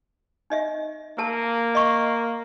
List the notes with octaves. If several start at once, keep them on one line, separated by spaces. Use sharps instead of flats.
D#4 D#5 E5
A#3 A#4 A5
D#5 C#6